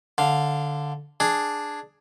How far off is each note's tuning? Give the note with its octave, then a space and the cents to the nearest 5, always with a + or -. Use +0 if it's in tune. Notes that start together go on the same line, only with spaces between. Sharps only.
D3 +0 F5 +0
D4 +0 G#4 +0